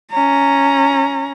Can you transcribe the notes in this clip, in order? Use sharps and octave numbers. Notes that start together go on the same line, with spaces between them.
C#4 A#5